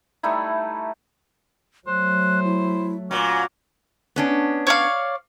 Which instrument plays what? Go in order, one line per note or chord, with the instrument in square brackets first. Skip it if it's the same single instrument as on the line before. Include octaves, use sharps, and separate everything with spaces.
[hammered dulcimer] G3 A3 D#4 E4
[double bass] F#3 A3 [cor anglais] C5 [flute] F#6
[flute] E4
[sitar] A#2 F#3 [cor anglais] C#4 [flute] D6
[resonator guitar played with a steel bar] B3 C#4 D4
[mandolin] C#5 D5 F5